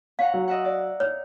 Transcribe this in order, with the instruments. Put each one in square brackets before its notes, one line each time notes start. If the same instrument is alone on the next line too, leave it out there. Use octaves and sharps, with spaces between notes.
[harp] C#4 F#5 A#5 [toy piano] F5
[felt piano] F#3
[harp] D#5 E5 F#5
D5
[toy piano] C#5 [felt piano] F6